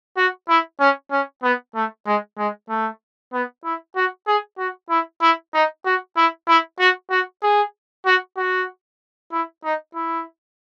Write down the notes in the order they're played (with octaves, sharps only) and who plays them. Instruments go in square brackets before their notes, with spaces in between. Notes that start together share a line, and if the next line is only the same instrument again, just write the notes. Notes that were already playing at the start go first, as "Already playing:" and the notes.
[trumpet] F#4
E4
C#4
C#4
B3
A3
G#3
G#3
A3
B3
E4
F#4
G#4
F#4
E4
E4
D#4
F#4
E4
E4
F#4
F#4
G#4
F#4
F#4
E4
D#4
E4